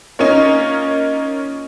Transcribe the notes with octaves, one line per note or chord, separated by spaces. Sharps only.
A#3 C#4 D#4 F4 A#4 C#5